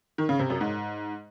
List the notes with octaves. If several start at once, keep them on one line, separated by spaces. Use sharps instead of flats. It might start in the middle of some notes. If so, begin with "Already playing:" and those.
D#3
C#3
C3
F#2
G#2